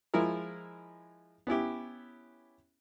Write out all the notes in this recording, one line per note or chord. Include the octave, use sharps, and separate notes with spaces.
F3 G#3 E4 A#4
B3 C#4 E4 G4